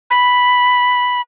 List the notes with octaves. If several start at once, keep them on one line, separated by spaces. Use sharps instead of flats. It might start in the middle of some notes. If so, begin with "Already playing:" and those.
B5